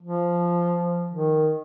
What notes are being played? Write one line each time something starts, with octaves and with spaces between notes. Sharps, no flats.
F3
D#3